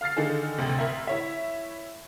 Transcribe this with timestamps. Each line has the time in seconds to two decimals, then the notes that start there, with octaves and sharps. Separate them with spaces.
0.01 F5 F6 A6 C7
0.16 D3 D#3 D#4 G#4 A4
0.58 A1 D2 C3
0.79 A1 A#4 E5
1.07 E4 C#5 E5